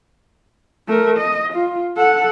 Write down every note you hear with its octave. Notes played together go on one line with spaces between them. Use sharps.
A3 A#4
D#5
F4
A4 F#5